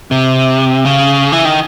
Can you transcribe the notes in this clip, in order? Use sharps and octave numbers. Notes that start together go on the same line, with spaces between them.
C3
C#3
E3
D#3